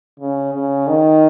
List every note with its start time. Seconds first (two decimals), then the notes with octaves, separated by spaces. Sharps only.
0.20 C#3
0.53 C#3
0.87 D#3